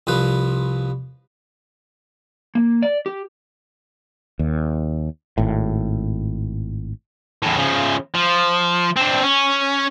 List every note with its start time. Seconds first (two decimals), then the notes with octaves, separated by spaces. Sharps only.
0.07 C2 F3 B4
2.55 A#3
2.83 D5
3.06 G4
4.39 D#2
5.38 G#1 A2
7.43 E2 A2
7.57 C#3 F3
8.15 F3
8.96 C4 D4
9.23 C#4